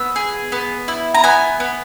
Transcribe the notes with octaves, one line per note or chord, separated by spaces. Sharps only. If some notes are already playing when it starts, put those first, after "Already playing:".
Already playing: B3 E6
G#4
B3
E4
A#5
B3 G#5
B3